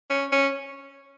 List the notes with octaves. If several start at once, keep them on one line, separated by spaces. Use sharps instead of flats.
C#4
C#4